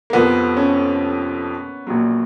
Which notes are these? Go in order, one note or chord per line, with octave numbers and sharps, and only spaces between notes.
A#3
F1 F2 F3 B3
C#4
A#1 A#2 F#3